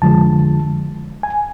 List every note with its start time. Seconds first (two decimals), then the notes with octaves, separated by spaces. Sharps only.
0.02 F2 D3 F3 G#3 A5
1.23 G#5